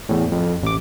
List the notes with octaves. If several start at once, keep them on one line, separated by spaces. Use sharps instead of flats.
E2 A2
F2
A1 D6